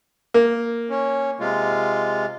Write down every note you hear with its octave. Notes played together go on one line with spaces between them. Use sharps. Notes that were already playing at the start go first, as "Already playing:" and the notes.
A#3
C#4
C3 G#3 F4